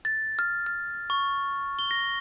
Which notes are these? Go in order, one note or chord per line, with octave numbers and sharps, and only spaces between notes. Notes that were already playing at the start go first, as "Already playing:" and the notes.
A6
F6
F6
C#6
G7
A#6